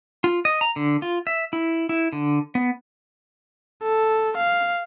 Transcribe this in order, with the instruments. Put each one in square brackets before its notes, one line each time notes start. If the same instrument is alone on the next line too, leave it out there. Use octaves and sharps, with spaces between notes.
[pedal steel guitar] F4
D#5
A#5
D3
F4
E5
E4
E4
D3
B3
[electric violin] A4
F5